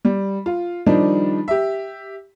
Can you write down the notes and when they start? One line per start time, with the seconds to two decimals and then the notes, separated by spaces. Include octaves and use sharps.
0.05 G3
0.46 F4
0.86 D#3 F3 G3 D4 D#4
1.48 G4 E5